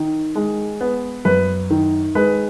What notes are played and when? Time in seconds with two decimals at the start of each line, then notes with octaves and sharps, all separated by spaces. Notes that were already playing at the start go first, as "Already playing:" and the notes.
Already playing: D#3
0.35 G#3
0.81 B3
1.25 F#2 B4
1.70 D#3
2.15 G#3 B4